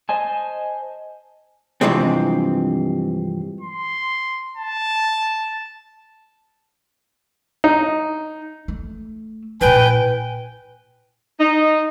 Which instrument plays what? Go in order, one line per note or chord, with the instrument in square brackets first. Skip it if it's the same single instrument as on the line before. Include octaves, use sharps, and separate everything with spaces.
[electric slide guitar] C5 D#5 G#5 A5
[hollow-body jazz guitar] G2 C3 E3 F3 G#3 C4
[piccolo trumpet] C6
A5
[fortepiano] D#4
[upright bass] A3
[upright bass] A#2 E4 [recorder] B4 [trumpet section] G5 G#5
[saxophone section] D#4